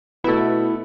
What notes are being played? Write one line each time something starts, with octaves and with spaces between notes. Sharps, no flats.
B2 A3 B3 E4